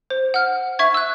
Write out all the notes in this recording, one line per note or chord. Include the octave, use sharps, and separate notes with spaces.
C5
F#5 F6
E5 C#6 G#6
E6 F#6